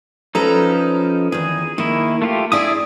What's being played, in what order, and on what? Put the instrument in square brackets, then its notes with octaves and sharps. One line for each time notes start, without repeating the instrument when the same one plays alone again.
[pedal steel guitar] F3 C#4 D#4 [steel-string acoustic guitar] A4 B4 A#5
[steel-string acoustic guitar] E2 D#3 [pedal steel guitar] G#4
[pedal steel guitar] D#3 E4 [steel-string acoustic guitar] A#3
[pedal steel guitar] A3 F4 G4
[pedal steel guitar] D4 E5 D#6 [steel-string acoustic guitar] E4 G#4 D5